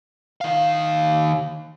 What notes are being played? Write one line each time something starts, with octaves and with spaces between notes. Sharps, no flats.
D#3 F5